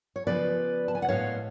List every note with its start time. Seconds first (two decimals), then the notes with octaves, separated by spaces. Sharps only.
0.16 C#5
0.27 C#3 F3 B3 B4 D5
0.88 A5
0.95 G#5
1.02 F#5
1.09 A2 G#3 B3 C#5 F5